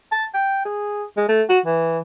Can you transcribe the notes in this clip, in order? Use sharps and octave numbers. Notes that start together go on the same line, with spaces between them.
A5
G5
G#4
G#3
A3
F#4
E3